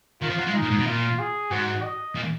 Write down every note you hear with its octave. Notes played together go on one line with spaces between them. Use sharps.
D#3 F4
F3
F#3
G#3
D#4
A#2
G#2
B2
A#2 F4
G#4
G#2 F#4
D#5
A#2